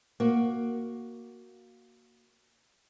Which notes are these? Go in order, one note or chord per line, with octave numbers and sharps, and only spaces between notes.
A#3 F#4